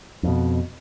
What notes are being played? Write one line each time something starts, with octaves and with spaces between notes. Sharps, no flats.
F2 B2